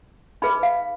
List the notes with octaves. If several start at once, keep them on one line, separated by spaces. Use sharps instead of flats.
D#4 G#4 B4 B5
F5